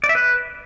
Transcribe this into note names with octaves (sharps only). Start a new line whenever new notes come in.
D5
E5
B4